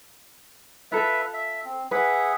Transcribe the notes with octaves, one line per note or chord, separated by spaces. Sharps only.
F4 A4 B4 E5
E5
C4
G#4 B4 E5 F#5